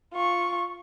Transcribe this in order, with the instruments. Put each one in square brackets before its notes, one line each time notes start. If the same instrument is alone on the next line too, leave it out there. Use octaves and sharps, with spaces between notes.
[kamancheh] F4 C#6